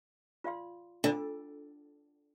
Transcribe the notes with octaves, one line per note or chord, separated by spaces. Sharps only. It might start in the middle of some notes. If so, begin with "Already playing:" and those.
F4 D5 F5 C6
D3 D4 F4 A4